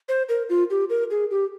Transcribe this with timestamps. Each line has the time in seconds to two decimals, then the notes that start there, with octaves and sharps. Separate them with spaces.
0.09 C5
0.29 A#4
0.50 F4
0.70 G4
0.90 A#4
1.11 G#4
1.31 G4